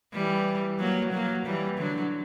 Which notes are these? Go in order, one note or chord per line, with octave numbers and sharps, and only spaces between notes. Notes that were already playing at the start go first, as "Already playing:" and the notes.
E3 G3
F#3 A#3
F#3 A#3
E3 G3
D3 F#3